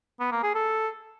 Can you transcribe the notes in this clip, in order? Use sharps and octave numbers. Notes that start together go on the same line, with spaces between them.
B3
A#3
G#4
A4